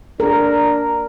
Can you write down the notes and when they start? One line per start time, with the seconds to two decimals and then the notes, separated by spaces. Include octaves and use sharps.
0.20 D4 A#4